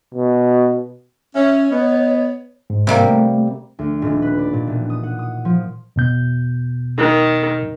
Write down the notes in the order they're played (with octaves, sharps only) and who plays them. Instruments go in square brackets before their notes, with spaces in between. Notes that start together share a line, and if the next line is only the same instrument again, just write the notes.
[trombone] B2
[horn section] C#4 [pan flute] C#5 [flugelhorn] E5
[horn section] B3 [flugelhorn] D#5
[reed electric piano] G#2
[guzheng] C3 G3 A#3
[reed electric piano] A3
[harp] D2
D#1
B4
D5
A#2
E1
D#6
F#5
D#6
F3
[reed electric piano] E2 B2 G6
[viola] D#3